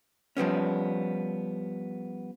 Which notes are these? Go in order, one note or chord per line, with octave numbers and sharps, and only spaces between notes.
F3 G3 B3 C#4